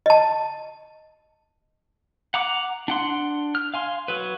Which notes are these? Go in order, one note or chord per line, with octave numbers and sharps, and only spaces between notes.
D#5 A5
F#5 A#5 D6
D4 F#5 C6
F6
F5 G#5 C6
F#3 B4